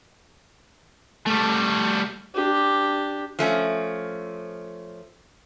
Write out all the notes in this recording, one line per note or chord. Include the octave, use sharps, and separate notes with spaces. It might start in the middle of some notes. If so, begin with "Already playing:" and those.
G3 A3
D4 G4
F3 A3 C#4